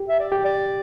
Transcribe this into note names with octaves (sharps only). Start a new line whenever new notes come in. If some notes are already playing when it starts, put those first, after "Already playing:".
Already playing: G4
E5
D5
G4
D5